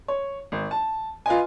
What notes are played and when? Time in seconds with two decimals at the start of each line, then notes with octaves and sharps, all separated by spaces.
0.08 C#5
0.52 G#1
0.71 A5
1.26 F4 B4 D#5 G#5